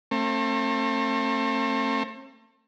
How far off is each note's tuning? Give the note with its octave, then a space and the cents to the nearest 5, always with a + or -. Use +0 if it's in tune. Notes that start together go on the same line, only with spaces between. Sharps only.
A3 +35 C4 +45